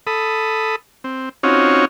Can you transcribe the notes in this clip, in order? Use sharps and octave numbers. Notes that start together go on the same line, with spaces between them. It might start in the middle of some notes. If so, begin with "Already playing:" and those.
A4 B5 D#6
C4
C4 C#4 D#4 F4 F#4 C#5